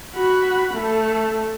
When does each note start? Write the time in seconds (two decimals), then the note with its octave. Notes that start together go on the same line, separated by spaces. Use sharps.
0.16 F#4 B5
0.75 A3 A4